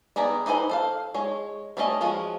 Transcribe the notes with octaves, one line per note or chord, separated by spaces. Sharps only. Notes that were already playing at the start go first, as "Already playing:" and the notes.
G3 B3 G#4 D5 A#5
D#4 G4 G#4 B4 C5
A4 C5 F5
G#3 C#5
G3 A3 C#4 D#4 D#5
F3 G#3 F4 F#4